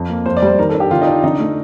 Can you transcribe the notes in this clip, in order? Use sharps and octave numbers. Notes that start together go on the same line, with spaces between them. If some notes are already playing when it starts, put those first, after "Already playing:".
Already playing: F2
A#3
F2 C5
D5
G3 C5
D#3 A#4
A4
D4
G4
D3 F4
D#4
D4
D3 D#4
A3